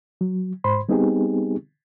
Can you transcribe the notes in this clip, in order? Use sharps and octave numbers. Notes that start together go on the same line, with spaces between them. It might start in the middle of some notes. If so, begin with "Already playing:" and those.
F#3
G#2 C5 B5 C6
G3 B3 C4 D#4 G4 G#4